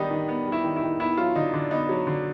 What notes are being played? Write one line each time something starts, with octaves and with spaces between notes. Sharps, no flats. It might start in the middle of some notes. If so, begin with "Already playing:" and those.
Already playing: D#3 G3 B3 D4 D#4
D#3
B3
G3
E4
D#3
E4
D#3
B3 E4
F#3 F4
D3 D#4
D3 D4
B3 D#4
F#3
D3